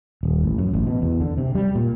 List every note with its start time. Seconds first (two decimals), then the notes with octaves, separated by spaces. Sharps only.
0.23 D#1
0.44 A1
0.58 F#2
0.73 A1
0.87 B2
1.02 E2
1.20 D3
1.38 C3
1.55 G3
1.75 A#2